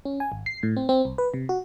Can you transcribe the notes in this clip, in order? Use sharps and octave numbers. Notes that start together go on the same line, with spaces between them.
C#4
G#5
G#1
C7
A2
C4
C4
C2
B4
C3
F#4